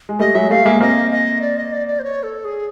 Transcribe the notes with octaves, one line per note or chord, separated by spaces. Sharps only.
G#3
G3 A3 D#5
F#3 G#3 E5
G3 A3 F5
G#3 A#3 E5
A#3 C4 D#5
D#5
D5
D#5
D5
D5
C5
C#5
A4
G#4